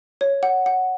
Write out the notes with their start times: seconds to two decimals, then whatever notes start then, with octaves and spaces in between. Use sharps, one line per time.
0.21 C#5
0.43 F#5
0.66 F#5